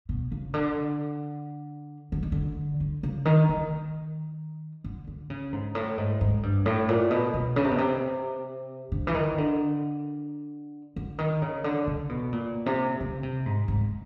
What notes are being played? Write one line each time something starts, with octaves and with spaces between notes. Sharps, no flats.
B2
C#3
D3
D3
D#3
D3
D3
C#3
D#3
D#3
D3
D3
C#3
G#2
A2
G#2
G#2
G2
A2
A#2
B2
B2
C#3
C3
B2
C3
D3
E3
D#3
D3
D3
D#3
C#3
D3
C#3
B2
A#2
C3
C#3
C3
G#2
G#2